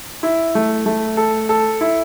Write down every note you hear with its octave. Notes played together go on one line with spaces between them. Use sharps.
E4
A3
A3
A4
A4
E4